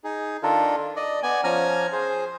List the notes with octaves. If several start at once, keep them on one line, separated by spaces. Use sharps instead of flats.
D#4 G#4
D#3 D4 F4 A4 A#4
D5 D#5
B3 D5 G#5
F3 C#4 G#5 A#5 F6
G#4 C5